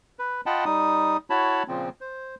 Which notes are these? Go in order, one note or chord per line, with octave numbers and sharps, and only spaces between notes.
B4
F4 D#5 F#5 G5 A5 B5
G3 D#4 D#6
E4 F#4 C#5 A5 B5
A#2 C#3 F3 C4
C5